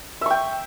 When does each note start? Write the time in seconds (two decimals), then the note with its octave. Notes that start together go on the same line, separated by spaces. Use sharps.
0.21 E5
0.26 C#6
0.30 G5